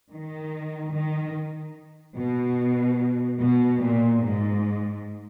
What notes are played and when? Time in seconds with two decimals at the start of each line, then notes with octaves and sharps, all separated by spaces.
0.11 D#3
0.93 D#3
2.17 B2
3.41 B2
3.82 A#2
4.23 G#2